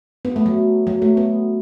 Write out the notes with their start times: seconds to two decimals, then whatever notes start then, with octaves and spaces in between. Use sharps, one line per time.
0.25 B3
0.36 A3
0.46 F#3
0.87 F#3
1.02 A3
1.17 B3